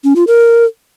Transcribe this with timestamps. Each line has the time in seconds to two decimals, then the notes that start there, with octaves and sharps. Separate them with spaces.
0.04 C#4
0.16 F4
0.27 A#4